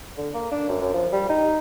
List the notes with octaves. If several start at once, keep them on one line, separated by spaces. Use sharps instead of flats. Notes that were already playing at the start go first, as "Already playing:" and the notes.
D3
A#3
D4
F#2
F#2
F3
G3
D#4